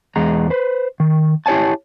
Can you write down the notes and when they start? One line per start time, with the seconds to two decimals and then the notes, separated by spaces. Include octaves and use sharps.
0.16 E2 G#3 A#5
0.50 B4 C5
1.00 D#3
1.46 E4 G4 C#5 G#5 A5